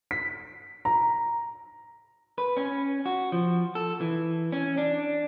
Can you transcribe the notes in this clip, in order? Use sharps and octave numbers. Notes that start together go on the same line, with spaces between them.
B6
A#5
B4
C#4
F#4
F3
A4
E3
C#4
D4